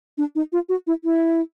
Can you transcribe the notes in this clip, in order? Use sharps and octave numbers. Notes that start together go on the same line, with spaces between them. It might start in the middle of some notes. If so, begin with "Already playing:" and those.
D4
D#4
F4
F#4
E4
E4